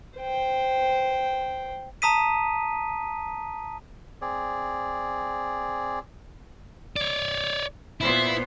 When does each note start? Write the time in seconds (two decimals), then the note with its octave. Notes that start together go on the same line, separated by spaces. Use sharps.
0.18 C5 G5
2.02 A5 A#5 D#6 B6 D#7
4.22 C4 G#4 D5
6.96 C#5 D5
8.01 A#2 B3 E4 C5